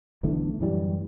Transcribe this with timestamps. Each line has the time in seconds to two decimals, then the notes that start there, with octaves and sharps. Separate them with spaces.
0.23 B1 D3 E3 A3
0.60 F#2 A2 E3 G3